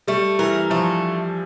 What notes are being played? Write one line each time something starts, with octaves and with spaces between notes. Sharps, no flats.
G3 A3
E3 A#4
F3 A3